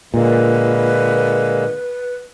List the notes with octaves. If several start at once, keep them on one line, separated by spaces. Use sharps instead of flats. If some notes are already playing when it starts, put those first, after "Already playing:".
A#2 D3 G#3 A#3 B4